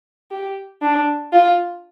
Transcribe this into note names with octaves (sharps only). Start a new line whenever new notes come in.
G4
D4
F4